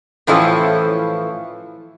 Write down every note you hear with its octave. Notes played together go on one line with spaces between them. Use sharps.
A2 E3 F3 C#4 E4 A4